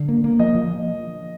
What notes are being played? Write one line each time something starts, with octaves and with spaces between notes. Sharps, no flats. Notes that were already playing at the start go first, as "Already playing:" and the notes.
Already playing: D3
A#3
A#3
F3 D#5
F3